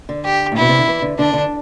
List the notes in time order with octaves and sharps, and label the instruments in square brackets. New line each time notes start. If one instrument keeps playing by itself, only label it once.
[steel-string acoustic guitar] D3
[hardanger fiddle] G4
[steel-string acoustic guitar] A2
[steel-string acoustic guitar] B2 [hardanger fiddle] E4
[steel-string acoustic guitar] C3
D3
E3
D3
[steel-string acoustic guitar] D3 [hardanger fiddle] D4
[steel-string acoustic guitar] D3